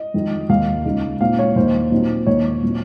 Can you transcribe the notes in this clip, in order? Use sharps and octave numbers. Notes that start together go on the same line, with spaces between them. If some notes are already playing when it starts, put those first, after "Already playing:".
Already playing: D#5
F2 D#3 G#3
D#2 D#3 A#3 D#4 F5
C#2 C#3 G#3 D#4
A#2 G#3 C4 D#4 F5
C#5
D#2 D#3 A#3 D#4 C5
A#2 F#3 C4 D#4
D#2 D#3 A#3 D#4 C#5
A#2 F#3 C4 D#4